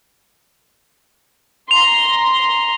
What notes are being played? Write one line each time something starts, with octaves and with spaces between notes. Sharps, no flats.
A#5 C6 F7